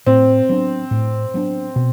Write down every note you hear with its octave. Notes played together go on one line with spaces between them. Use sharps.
A2 C4
F#3 B3 D4
A2
F#3 B3 D4
B2